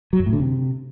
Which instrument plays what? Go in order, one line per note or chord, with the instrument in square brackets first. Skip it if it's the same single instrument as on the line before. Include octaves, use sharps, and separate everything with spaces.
[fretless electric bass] F#3
F#2
A2
D3
C3